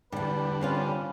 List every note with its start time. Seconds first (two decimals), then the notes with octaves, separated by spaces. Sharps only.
0.12 E2 G2 D3 G3 B4
0.61 C4 C#4 F4